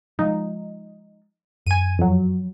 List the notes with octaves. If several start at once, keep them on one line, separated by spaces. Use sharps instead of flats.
F3 G#3 D#4
F#2 G#5 D#7
F2 F#3